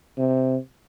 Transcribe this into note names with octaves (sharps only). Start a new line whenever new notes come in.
C3